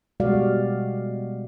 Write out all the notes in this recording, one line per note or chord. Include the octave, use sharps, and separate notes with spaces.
B2 G3 G#3 F#4 D5 F5